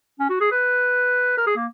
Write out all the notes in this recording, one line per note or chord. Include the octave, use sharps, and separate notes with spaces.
C#4
F#4
G#4
B4
A#4
G#4
A#3